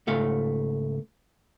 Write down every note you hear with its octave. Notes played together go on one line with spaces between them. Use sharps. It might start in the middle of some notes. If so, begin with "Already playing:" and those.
C#2 G#2 A3 F5